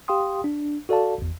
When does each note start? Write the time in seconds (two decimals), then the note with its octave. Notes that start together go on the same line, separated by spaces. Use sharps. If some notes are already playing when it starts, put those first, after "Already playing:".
0.08 G4 F5 G5 C6 D#6
0.44 D4
0.89 F#4 A4 D5 F5 A5
1.18 G#1 E2